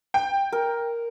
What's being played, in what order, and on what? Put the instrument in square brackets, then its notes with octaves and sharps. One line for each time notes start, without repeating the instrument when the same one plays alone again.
[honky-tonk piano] G5
[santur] A#4